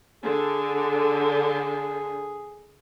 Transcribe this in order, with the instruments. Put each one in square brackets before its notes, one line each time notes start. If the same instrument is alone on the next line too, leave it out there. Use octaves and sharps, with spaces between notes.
[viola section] D3 [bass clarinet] G#4